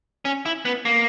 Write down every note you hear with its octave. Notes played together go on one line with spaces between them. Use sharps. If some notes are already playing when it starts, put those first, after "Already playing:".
C#4
E4
B3
A#3